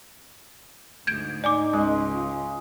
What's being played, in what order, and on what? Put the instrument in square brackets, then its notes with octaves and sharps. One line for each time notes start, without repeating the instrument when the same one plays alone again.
[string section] D2 G#2 [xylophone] G6 G#6 D7
[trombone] D#4 [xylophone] D5 G#5 D6
[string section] C#2 [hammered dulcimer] G#3
[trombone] F4